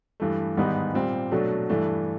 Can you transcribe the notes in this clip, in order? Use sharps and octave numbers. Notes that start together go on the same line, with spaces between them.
G2 E3 A3
G#2 D#3 G3 B3 D#4
A#2 G3 C4
B2 F#3 A3 D4
G2 E3 A3 D4